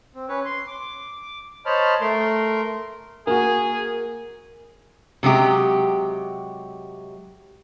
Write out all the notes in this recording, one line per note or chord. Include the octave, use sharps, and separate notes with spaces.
C4
C#4 B4 C#5
C6
D6
C5 C#5 D#5 A5 B5 F6
A3 A#4 C6
A#3 F#4 G#4 A#4
C3 F#3 G#3 G4